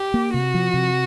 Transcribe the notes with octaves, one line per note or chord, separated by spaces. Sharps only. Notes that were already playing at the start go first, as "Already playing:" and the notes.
Already playing: G4
A#3
C3 F#4
F3
C3